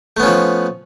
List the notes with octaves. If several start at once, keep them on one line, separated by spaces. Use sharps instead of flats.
F3 A3 B3 C#4